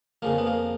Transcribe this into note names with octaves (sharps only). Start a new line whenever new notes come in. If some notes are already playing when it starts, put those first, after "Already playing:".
F2 C#3 F3 A#3
B3
A#3